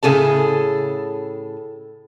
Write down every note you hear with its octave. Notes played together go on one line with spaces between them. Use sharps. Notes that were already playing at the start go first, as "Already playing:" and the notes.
A2 C#3 G#4 A4 A5